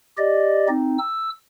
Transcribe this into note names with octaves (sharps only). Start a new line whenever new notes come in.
G4 D5 D#5
C4 D#4
E6